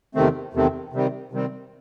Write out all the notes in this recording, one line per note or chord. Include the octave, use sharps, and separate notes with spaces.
E2 C3 D#3 A3 C4
E2 C3 D#3 A3 C4
C3 D#3 G3 C4
C3 D#3 G3 C4